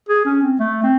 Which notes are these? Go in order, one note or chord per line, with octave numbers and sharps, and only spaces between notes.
G#4
C#4
C4
A3
C4